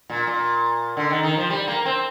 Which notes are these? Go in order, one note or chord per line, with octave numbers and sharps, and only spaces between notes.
A#2
A#2
D3
D#3
D#3
F3
G3
A#3
C4